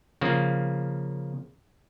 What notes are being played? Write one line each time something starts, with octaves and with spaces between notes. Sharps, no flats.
C#3 F3 A#3